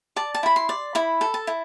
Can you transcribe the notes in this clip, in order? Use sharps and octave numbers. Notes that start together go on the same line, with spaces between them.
D5 A5
A5
E4 B5
C6
D5
E4 B5
A4
A5
E4